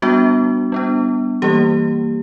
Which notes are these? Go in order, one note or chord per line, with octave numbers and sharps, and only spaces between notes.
G3 B3 D4 F#4
G3 B3 D4
E3 G3 A#3 G4